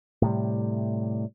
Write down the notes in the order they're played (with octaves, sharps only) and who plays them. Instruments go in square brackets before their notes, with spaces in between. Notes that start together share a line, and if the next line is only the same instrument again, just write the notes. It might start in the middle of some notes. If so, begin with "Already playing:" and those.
[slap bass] A2 C3 G3